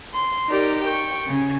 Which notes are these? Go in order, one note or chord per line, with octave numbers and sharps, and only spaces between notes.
C6
D#4 G4 A#4 D5
G5 C#6
C#3